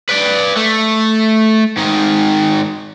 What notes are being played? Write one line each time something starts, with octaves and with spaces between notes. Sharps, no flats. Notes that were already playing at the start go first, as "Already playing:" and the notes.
B4 D5
A3
G#2 D#3